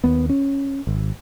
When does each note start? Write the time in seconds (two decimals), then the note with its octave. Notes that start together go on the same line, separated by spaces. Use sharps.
0.04 D#2 B3
0.29 C#4
0.87 G#1